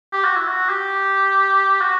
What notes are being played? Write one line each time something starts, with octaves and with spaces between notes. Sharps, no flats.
G4
F#4
E4
F#4
G4
F#4